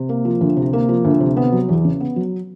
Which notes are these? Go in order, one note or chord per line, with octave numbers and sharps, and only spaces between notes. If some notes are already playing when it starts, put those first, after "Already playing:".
Already playing: C3
A#3
F3
D2
C3
A#3
F3
D2
C3
B3
F#3
E2
C#3
B3
F#3